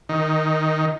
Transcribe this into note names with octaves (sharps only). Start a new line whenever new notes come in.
D#3